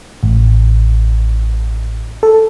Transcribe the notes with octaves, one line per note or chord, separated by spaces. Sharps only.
A1
A4